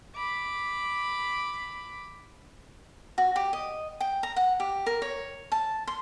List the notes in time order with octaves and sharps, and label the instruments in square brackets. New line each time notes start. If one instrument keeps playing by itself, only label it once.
[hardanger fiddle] B5 D6
[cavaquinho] F#4
G4
D#5
G5
A#5
F#5
G4
A#4
C#5
A5
C6